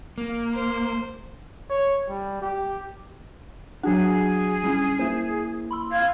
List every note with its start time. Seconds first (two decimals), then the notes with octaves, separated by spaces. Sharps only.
0.18 A#3
0.54 C5
1.70 C#5
2.08 G3
2.42 G4
3.83 F#3 D4 F#4 G#4 F#5
4.64 G3 C#4 E4
4.99 A#3 E4 C5
5.71 B5 C6 E6
5.92 F5 G#6